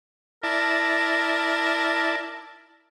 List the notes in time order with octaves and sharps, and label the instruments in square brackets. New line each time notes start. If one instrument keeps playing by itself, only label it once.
[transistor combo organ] E4 D5 A5 [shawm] A#4